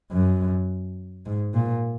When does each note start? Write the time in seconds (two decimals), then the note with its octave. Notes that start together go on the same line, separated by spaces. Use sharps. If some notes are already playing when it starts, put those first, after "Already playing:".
0.12 F#2
1.26 G#2
1.54 A#2